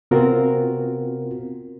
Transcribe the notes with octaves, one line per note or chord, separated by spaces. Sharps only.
C3 B3 C4 F4 F#4 A#4